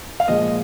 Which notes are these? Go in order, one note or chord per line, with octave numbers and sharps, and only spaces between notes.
F5
A#2 F3 G#3 D#5